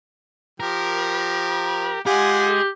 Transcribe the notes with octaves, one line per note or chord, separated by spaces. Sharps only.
F3 G4 A#4
G#3 F4 G4 G#4 F#5 G#5